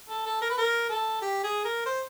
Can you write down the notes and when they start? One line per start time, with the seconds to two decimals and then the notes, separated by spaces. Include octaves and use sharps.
0.09 A4
0.26 A4
0.42 A#4
0.50 B4
0.58 A#4
0.90 A4
1.22 G4
1.44 G#4
1.65 A#4
1.86 C5